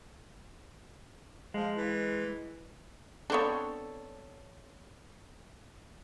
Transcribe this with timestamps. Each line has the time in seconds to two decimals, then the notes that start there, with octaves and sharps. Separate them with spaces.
1.54 F3 G#3
1.77 E3
3.30 B3 C4 D4 A4 C#5